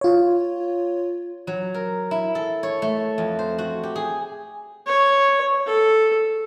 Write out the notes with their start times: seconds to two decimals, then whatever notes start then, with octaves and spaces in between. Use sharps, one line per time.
0.01 F4 C#5
1.47 F#3
1.74 A#4
2.11 E4
2.35 A4
2.63 C#5
2.82 A3
3.18 F2
3.39 C5
3.58 F#4
3.83 G4
3.96 G#4
4.86 C#5
5.66 A4